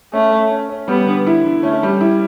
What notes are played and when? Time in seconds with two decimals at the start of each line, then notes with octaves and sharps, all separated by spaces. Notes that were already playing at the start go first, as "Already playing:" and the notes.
0.13 A3 C#4
0.32 C#4
0.50 C#4
0.69 C#4
0.88 G3 B3
1.07 D3
1.27 E4
1.45 D3
1.63 A3 C#4
1.83 G3
2.01 E4